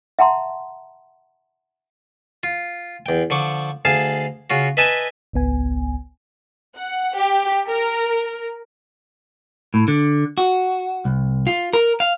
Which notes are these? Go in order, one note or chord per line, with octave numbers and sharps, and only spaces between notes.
E5 F#5 A5 A#5 C6
F4
E2 G5
D3 F3 C#6 D6
D2 G#4 F5 A5
C#3 F4 F#4
B4 D#5 E5 G#5 A5
G#1 C#2 B3 G#5
F#5
G4
A#4
A2
D3
F#4
C2
F4
A#4
F5